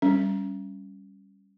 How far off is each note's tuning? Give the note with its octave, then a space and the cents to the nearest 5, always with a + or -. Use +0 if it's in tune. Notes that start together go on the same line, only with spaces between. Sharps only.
G3 +0 C#4 +0